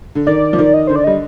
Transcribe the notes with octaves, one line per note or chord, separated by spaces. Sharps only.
D3
D#3 D5
F3
D#3
D#5
D3 C5
D5
G3 D#5